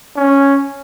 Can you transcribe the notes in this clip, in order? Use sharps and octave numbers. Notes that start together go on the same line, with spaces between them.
C#4